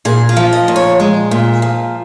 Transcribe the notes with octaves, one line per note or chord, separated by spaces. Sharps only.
A#2 G#4
F4
F3
D#5
A#2
C#5
G#3
A#2
F3